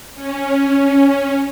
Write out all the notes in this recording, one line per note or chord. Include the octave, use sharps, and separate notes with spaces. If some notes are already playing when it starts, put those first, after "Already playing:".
C#4